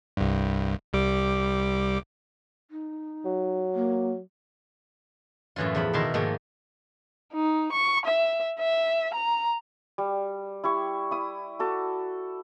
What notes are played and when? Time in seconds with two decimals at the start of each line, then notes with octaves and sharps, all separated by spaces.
0.17 C2 G2
0.93 C2 G3 D6
2.71 D#4
3.25 F#3
3.75 A#3
5.56 F#2 A2 E3 F#3 F4
5.75 E2 F3 B5
5.93 B2 D#3 E4 A#4 A5 C6
6.14 G#2 D#3 F3 A3 A#3
7.33 D#4
7.73 C#6
8.06 E5
8.60 E5
9.14 A#5
9.98 G3
10.64 E4 G4 C#6
11.11 E4 D#6
11.59 F#4 A4 D6